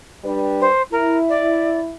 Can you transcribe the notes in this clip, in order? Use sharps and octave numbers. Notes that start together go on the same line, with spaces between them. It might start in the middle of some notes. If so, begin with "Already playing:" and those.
G3 D4 B4
C5
E4 A#4
D5